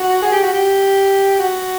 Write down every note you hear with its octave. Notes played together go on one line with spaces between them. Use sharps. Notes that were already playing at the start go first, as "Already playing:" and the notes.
Already playing: F#4
G#4
G4
F#4
G4
F#4